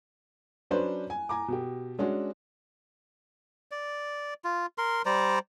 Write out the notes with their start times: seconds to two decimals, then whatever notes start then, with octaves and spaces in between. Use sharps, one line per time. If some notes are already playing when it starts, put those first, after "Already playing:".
0.71 F#3 C#4 D4 B4 C5
1.10 G#5
1.29 G#5 A#5 D6
1.48 B2 G4
1.99 G#3 C#4 D4 F#4
3.71 D5
4.44 F4
4.78 A#4 C6
5.06 G3 C5 D5 A#5